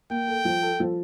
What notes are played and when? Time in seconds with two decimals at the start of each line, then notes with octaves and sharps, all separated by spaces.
0.10 A#3 G5
0.28 A4
0.45 F3
0.62 A4
0.80 F3